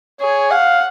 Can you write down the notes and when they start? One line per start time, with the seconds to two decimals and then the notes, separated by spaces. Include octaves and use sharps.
0.21 G#4 C#5
0.51 F5 F#5